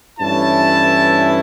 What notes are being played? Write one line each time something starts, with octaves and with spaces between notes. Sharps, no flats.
G2 E3 A3 C#4 E4 A5